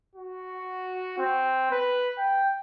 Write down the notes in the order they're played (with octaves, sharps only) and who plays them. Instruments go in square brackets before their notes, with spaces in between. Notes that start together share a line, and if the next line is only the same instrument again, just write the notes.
[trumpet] F#4
C4
B4
G5